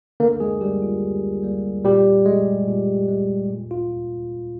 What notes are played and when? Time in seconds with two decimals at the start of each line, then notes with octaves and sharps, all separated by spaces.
0.20 D3 A#3 A#4
0.40 G#3 G#4
0.61 G3 A#3 G4
0.82 F4
1.03 D3
1.43 G3 A#3
1.85 A#2 G3 G4
2.26 G#3
2.68 A#2
3.08 G#3
3.50 A#2
3.71 F4